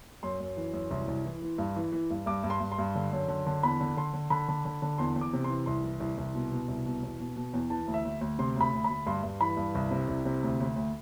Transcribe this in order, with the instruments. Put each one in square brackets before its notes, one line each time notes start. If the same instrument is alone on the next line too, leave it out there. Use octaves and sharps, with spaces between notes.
[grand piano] F#2 C6
F#2
E3
F#2
C2 C6
C2
E3
E3
G2
E3
E3
G2
G2 D6
G2
C6
G2
C6
G2
D3
F#2
D3
D3
E2 B5
D3
D3 C6
D3
D3 B5
D3
D3
D3
E2 C6
E2
D6
C3
C6
E3
C2 C6
E3
C2
C2
B2
B2
C2
B2
E2
B2
B2
E2
E3 A5
D2
E5
D2
D2
C3 C6
D2 B5
D2
B5
D2
G2 C6
G2
E3 B5
G2
C2
C3
C2
C3
D2
D2
D2